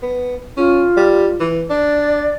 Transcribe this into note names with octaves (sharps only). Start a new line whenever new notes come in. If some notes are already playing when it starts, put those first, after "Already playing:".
B3
C#4 F4
G3
E3
D4 D5